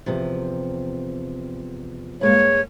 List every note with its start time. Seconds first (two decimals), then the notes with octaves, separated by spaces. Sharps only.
0.06 E2 C3 F3
2.21 G2 G#3 A#3 C#5